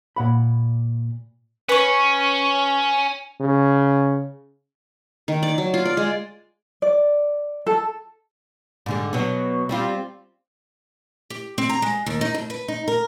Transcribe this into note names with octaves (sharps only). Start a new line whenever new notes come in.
A#2 F#5 B5
C#4 B4 C#5
C#3
D#3
D5
F#3
F4
D5
G#3
D5
A4
G#2 D3 G3
B2 F#3
G3 C4 F4
G4
C4
A#5
G#3
D#2
D#4
F2
B4
D#4
A#4